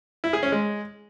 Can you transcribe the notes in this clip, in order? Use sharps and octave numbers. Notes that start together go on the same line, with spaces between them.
E4
G#4
C#4
G#3